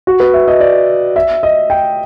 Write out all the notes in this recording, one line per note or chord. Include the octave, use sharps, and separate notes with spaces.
F#4
B4
E5
D#5
D5
E5
D#5
G5